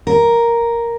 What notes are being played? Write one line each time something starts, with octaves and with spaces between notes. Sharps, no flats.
A#4